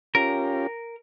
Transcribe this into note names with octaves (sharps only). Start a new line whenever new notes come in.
C#4 F4 G4 A#4